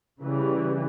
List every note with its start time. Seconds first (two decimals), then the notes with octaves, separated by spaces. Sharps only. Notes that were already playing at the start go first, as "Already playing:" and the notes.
0.20 C#3 E3 G3